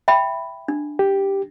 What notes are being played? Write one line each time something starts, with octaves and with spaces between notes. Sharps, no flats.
E5 G5 B5
D4
G4